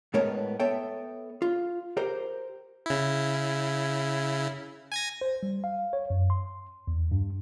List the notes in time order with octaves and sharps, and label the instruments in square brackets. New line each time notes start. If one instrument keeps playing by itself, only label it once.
[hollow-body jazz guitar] A2 G#3 B3 A#4 C#5 A5
B3 A4 C#5 E5 G5
F4
G4 A#4 C5
[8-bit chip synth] C#3 E4
G#5 G#6 A#6
[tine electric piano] C5
G3
F5
C#5
F#2
C6
E2
G2